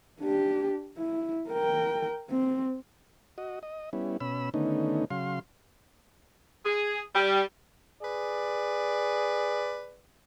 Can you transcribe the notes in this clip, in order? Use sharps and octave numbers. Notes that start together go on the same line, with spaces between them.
D4 G4
E4
A#4 G5
C4
F#4 D#5
D#5
G3 B3 C#4 E4
B2 C#4 B5 E6
D3 D#3 A3 B3 C#4 D#4
C#3 F#3 F5 C6
G#4
G3
G#4 B4 D5